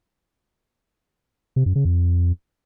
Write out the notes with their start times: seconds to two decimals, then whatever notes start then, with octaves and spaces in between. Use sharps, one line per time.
1.56 C3
1.66 F#2
1.75 C#3
1.85 F2